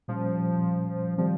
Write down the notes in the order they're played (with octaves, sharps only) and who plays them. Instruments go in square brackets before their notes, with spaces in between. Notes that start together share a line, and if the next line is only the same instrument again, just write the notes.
[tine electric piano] A#2 G3 C#4 [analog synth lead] F3
[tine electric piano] D#3 G3 C4 [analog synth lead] F3